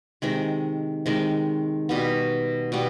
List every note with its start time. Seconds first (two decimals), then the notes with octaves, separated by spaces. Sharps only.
0.22 C3 D#3 G#3
1.06 C3 D#3 G#3
1.89 B2 G3 B3
2.72 B2 G3 B3